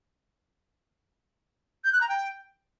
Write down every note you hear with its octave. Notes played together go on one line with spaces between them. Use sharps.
G6
F#6
A#5
G5